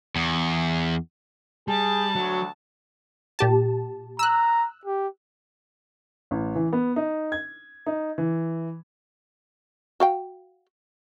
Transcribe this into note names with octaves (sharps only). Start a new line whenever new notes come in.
E2
G3 G#4 A5
D2 F#3
A#2 G4 A5
A#5 E6 F#6
G4
A1
E3
B3
D#4
G#6
D#4
E3
F#4 F5 G5